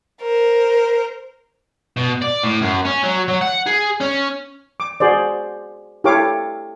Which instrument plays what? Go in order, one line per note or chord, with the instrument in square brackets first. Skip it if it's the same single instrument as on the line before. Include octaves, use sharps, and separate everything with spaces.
[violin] A#4 C5
[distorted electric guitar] B2
D5
A2
F#2
C#4
F#3
F#3
F#5
G#4
C#4
[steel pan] D6
F#4 G#4 C5 D5
E4 G4 A4 C#5 F5 D6